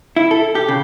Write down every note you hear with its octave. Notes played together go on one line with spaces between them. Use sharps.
E4
A4
G4
C#3